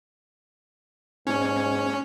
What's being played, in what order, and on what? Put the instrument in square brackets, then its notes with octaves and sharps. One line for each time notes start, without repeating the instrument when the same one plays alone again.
[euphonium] G#2 [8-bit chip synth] C#4